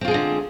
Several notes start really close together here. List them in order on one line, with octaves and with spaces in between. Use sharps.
C4 F4 G#4 G#3 D3